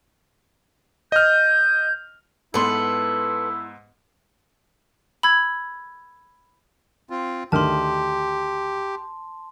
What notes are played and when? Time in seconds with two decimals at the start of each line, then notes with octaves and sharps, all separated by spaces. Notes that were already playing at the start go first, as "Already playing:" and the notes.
1.12 D#5 F6 G6
2.54 G#2 B3 E4 A4 B4 C6
5.23 B5 E6 G#6
7.10 C4 F4
7.52 D2 D#3 G4 A5 C6 F6